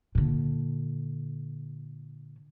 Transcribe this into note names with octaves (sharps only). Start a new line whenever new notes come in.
A#2 D3